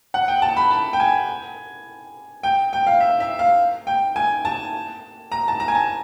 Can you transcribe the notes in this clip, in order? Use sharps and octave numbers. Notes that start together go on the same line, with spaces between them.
F#5
G5
A5
B5
A5
G5
G#5
G5
G5
F5
E5
E5
F5
G5
G#5
A5
A#5
A5
A#5
G#5
A5